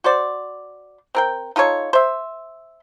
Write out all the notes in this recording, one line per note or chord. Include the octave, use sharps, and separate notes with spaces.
F#4 C5 D5
C4 A#4 G5
D#4 F4 A4 C#5
C5 E5